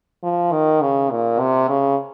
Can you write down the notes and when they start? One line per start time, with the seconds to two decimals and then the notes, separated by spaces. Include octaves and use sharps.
0.23 F3
0.52 D#3
0.81 C#3
1.11 A#2
1.39 C3
1.69 C#3